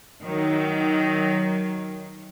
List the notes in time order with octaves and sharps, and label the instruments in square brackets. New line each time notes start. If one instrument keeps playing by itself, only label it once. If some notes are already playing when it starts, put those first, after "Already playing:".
[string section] D#3 F#3